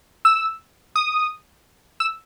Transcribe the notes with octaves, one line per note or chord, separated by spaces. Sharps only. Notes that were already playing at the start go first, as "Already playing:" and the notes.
E6
D#6
E6